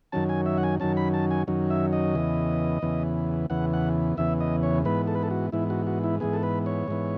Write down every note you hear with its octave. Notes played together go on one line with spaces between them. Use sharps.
F#2 D#3 F#3 C#4 A5
G#5
E5
F#5
G#5
F#2 D#3 F#3 C#4 A5
B5
A5
G#5
F#2 D#3 F#3 C#4
E5
D#5
E2 C#3 E3 B3
E2 C#3 E3 B3
E2 C#3 E3 B3 F#5
F#5
E2 C#3 E3 B3 E5
D#5
C#5
G#2 E3 B3 B4
A4
B4
A4
F#4
G#2 E3 B3 E4
F#4
F#4
E4
G#2 E3 B3 G#4
A4
B4
C#5
G#2 E3 B3